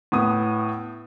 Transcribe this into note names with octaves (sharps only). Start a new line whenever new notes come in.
A2 B3 D#6